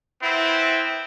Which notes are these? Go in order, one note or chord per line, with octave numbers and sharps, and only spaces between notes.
B3 C4 E4